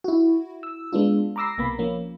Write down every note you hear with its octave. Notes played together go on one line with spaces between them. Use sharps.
E4 F#4
E6
G#3 B3 D4 F4
A#5 B5 D6 E6 A#6 C7
B1 C3 A#3 B3 B5
F3 A#3 C#4